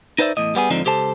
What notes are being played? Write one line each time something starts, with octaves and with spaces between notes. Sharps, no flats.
D#4 B4 C5 D5 E5
E2 A2 D#5
G3 B3 G4 G#4
G#2 D3 F3 C4 D4 D#4
C#2 G4 A4 C5 A5